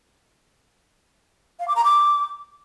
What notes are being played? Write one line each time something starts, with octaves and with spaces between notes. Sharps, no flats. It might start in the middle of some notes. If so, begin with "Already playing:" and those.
F5
D6
A#5
D6